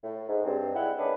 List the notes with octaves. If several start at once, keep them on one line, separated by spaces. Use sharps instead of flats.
A2
G#2
G2 C4
G3 G#3 E4 F#5 G5
D#3 G#3 C#4 D4 B4